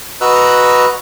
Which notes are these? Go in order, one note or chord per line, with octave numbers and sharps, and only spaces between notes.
F#4 B4 D#5 A#5 E6 F#6